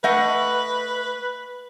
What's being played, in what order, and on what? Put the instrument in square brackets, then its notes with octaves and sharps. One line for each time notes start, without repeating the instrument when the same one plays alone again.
[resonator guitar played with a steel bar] A3 D#5 F#5 [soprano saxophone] B4